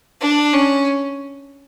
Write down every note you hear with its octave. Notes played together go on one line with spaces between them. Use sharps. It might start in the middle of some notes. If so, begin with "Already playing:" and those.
D4
C#4